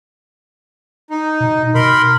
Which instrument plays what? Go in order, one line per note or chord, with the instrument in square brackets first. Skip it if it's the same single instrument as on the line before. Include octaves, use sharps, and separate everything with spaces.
[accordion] D#4
[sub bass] B2
[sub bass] B2 [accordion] A#4 B5 C6